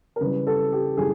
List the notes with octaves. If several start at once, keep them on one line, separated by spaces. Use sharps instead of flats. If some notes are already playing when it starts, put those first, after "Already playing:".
A#4
C#3 E3 G3 B4
A4
G4
C#3 E3 G3 G#4